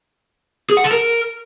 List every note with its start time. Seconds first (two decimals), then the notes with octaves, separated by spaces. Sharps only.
0.70 G#4
0.77 F#5
0.84 A4
0.91 A#4